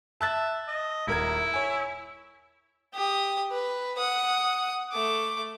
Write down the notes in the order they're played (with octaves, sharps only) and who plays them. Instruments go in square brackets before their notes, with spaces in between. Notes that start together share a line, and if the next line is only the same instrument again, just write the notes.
[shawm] E5 [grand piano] A5 F#6 A6
[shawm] D#5
[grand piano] D#1 A#4 G#6 [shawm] E4
[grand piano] C#5 G#5
[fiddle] G4 D#6
B4
F#5 D#6
A3 D6